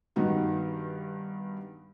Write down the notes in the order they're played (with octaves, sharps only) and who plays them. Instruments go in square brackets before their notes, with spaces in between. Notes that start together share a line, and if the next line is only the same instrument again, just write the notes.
[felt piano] G2 D#3 B3 D#4 F#4